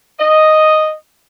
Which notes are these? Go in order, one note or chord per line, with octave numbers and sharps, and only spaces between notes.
D#5